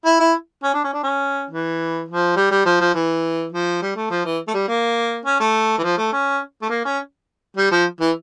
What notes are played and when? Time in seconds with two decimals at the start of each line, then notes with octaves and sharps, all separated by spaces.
0.06 E4
0.20 E4
0.64 C#4
0.74 D4
0.84 C#4
0.93 D4
1.04 C#4
1.51 E3
2.08 F3
2.36 G3
2.51 G3
2.66 F3
2.80 F3
2.94 E3
3.52 F3
3.82 G3
3.96 A3
4.10 F3
4.25 E3
4.48 A3
4.54 G3
4.68 A#3
5.26 C#4
5.40 A3
5.78 E3
5.83 F3
5.98 A3
6.13 C#4
6.62 A3
6.70 A#3
6.85 C#4
7.57 G3
7.71 F3
8.00 E3